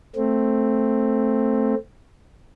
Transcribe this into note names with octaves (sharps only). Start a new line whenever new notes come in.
A3 C4